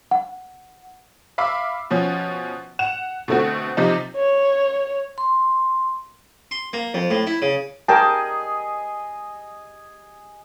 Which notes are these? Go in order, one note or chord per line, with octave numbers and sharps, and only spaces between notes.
F#5
E5 F5 B5 D6 E6
B2 F3 C#4
F#5 E7 F7
B2 D3 A3 C4 F#4
C3 F3 D#4
C#5
C6
C6
A#3
F2
A2
E4
C#3
G#4 A#4 D#5 G5 A5